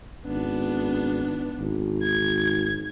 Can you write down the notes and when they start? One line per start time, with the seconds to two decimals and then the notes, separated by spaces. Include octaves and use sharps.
0.26 G#1 B3 D4
1.60 G#1
2.03 G#6